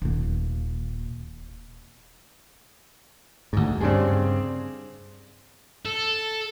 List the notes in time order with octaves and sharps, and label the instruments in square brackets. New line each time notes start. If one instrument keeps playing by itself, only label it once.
[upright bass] D#1 A#3
[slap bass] D2 G#2
[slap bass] G2 C#3 [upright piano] C4 D4 G#4
[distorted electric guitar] A4